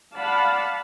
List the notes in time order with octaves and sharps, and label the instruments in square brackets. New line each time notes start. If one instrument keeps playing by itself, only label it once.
[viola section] D5 F5 F#5 A5 B5